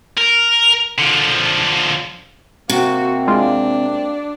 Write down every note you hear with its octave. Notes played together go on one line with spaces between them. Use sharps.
A#4
D3 F3
C3 A#3 C4 F#4
G#3 D4 F4